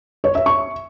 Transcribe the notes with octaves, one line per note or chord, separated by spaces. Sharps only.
C#5
E5
C#6